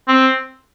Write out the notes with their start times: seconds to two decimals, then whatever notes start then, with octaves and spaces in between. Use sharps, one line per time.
0.08 C4